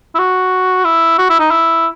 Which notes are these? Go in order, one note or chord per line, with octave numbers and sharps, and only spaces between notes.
E4
F#4
E4
F#4
E4
D#4
E4